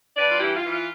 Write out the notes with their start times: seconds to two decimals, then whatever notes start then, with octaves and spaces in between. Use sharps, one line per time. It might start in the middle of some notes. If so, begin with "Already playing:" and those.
0.17 G2 B4 D5
0.31 F4
0.40 E3 E4 G4
0.56 F4
0.64 E3
0.72 F4